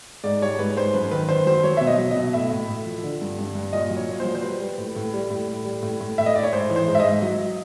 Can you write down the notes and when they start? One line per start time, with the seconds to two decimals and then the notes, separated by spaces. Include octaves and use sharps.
0.24 G#2 D5
0.42 G3 C#5
0.59 G#2 B4
0.77 G#2 C5
0.94 F#2 B4
1.11 D#3 B4
1.28 D#3 C5
1.46 F#3 C5
1.64 F#3 C#5
1.77 B2 E5
1.87 D#5
1.98 F#3
2.11 B2 D#5
2.33 A2 E5
2.51 A2
2.68 A2
2.86 F3
3.03 D3
3.22 G2
3.39 G2
3.55 G2
3.73 A#2 D#5
3.90 F#3
3.97 C#5
4.08 A#2
4.20 C5
4.25 F#3
4.35 C5
4.43 G3 B4
4.60 G3
4.78 A2
4.96 A2
5.14 G3
5.30 A2
5.48 A2
5.65 G3
5.83 A2
6.00 A2
6.18 A2 E5
6.26 D#5
6.35 A2 D5
6.43 C#5
6.53 G#2 C5
6.70 E3
6.76 C5
6.88 G#2
6.95 E5
7.00 G#2 D#5
7.22 F#3